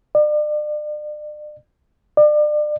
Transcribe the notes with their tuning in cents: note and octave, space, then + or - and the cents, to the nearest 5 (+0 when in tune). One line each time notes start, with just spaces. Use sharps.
D5 +40
D5 +35